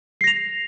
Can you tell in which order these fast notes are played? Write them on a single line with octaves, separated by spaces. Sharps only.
C7 A#6 F7